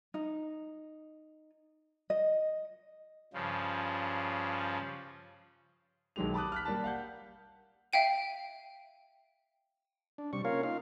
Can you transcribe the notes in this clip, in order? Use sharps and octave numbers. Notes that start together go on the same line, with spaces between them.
D#4
D#5
G2 C#3 F3
B1 D#3 F#3 G#3 G4 F7
A5 B5 D6 D#6 F#6
F6 F#6 B6
G3 A#3 D5 A5
F5 F#5 G6
E5 F5 G5 D#7
D4
C3 G3 C#6
A#3 C#4 F4 A#4 C#5 F5
D#4 F4 F5